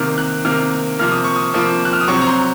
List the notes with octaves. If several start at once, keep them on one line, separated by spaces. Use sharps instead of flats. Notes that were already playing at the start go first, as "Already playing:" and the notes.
Already playing: C3 D#3 A#3 F6
F#6
C3 D#3 A#3 F6
C3 F3 A#3 F6
D#6
C#6
D#6
C3 F3 A#3 D#6
F#6
F6
D#6
C3 F#3 C4 C#6
A#5
C6